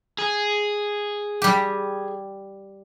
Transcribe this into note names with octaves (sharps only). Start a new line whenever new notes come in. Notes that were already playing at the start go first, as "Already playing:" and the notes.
G#4
G3 G4